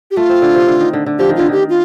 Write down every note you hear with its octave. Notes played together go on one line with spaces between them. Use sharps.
G4
A3 F4
C4
D3
C3
D3
D#3
D3
D3
F3 G4
D#3
D3 F4
D#3 G4
F4